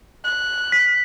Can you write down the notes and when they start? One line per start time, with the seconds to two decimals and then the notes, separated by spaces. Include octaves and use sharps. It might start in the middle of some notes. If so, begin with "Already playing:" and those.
0.24 F#6
0.72 B6